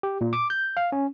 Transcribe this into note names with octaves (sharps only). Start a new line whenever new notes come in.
G4
A#2
D6
G6
F5
C#4